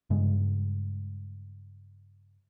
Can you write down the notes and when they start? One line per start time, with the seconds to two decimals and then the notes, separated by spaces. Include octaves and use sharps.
0.10 G2 C#3 G#3